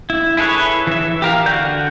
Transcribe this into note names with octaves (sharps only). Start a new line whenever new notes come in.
E4
E4 G#4 A4 B4 C#5
E3 E5
G4 A#4 F5
D3 F#4 D5 G6